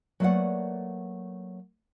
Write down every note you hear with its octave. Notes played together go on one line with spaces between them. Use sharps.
F#3 A3 A#3 B4 D5 F#5